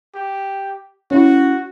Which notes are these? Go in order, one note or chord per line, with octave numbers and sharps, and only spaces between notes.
G4
C#4 E4 F#4